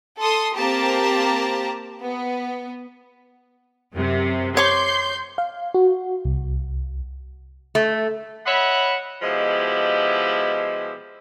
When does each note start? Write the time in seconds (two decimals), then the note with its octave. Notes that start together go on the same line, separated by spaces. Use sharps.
0.19 A4 C6 D#6
0.55 A#3 C4 G4 A5 A#5
2.01 B3
3.93 F#2 C3
4.57 C#5 C6 D6 G6
5.38 F5
5.74 F#4
6.25 C2
7.75 A3
8.46 C#5 D#5 E5 F#5 B5
9.22 B2 F3 G#3 E4 F4 G4